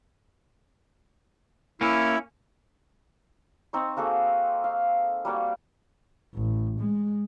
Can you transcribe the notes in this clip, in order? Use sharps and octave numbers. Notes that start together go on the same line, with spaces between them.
A#3 C#4 E4
C4 D#4 C#6
A#3 F#4 G#4 A4
F5
G3 A#3 F#4 D5
A1
G#3